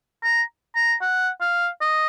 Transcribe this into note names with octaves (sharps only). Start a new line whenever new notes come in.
A#5
A#5
F#5
F5
D#5